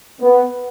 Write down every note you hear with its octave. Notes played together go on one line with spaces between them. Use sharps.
B3